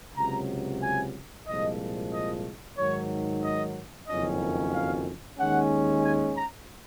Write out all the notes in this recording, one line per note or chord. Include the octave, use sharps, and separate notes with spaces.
C#2 C3 F#3 A#5
G#5
C2 A#2 F3 G#3 D#5
D#5
G#2 D#3 F#3 C#5
D#5
F#1 F2 D#3 F#3 C#4 D#5
F5
D#2 D#3 G#3 C#4 F#5
G#5
A#5